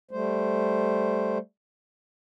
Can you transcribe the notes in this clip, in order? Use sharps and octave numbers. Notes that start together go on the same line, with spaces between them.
G3 A3 C5